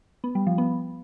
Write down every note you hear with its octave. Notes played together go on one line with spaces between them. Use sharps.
B3
G3
F3
B3